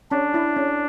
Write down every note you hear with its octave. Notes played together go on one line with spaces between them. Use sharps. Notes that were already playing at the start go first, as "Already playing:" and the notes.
C#4 D4
E4
C#4